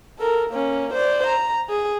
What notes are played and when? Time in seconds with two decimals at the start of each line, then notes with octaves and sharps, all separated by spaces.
0.19 A4 A#4
0.50 A#3 C#4
0.93 C5 D5
1.27 A#5
1.69 G#4